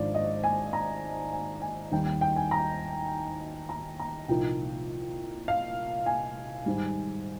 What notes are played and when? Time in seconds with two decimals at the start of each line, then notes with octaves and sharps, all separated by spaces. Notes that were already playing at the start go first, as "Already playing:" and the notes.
Already playing: G#1 G#2 F3 G#3 D4 D5
0.15 D#5
0.44 G#5
0.73 A#5
1.33 G#5
1.62 G#5
1.92 D#2 D#3 G3 G5
2.06 G5
2.21 G5
2.36 G#5
2.51 A#5
3.69 A#5
3.99 A#5
4.28 C2 A#2 F3 A#3 D#4 G5
5.48 F5
6.06 G#5
6.66 G#1 G#2 G3